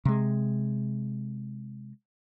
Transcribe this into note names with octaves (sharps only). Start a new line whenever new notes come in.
C3 G#3